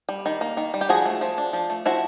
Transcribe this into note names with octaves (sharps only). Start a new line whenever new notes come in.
G3
D#3
A#3
D#3
G3
G4
F3 F#4 G#4
A3
F3
D4
F3
A3
F3 E4 F#4